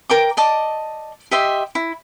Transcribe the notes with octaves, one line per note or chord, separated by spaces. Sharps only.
A#4 G5 D6
D5 D#5 A5 D6
G4 D#5 E5 C6
E4